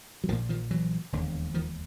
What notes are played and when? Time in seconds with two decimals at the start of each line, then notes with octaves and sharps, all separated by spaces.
0.24 F#3
0.28 A#1 D#3 F3
0.32 A#2
0.49 D#3 F3
0.71 E3 F#3
1.12 E1 D#2 D3
1.54 D#3 F3